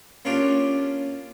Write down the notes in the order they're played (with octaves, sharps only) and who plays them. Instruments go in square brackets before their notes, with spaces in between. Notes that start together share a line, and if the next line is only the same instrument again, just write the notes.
[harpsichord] A#3 C#4 D4 F4 G4